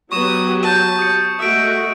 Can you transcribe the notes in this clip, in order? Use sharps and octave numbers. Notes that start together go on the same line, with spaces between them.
F#3 B3 G4 C#6 D#6 E7
A5 G6 D#7
D#6 C#7
G#3 A3 F#4 E5 D#6 D7